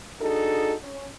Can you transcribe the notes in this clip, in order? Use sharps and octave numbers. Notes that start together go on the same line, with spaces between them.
D4 D#4 F#4 G#4 A4
C#4